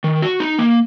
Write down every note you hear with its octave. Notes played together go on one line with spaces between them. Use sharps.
D#3
F#4
D#4
A#3